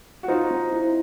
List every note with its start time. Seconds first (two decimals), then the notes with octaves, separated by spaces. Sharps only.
0.23 F#4
0.28 D#4 F4 C5
0.51 C4
0.72 E4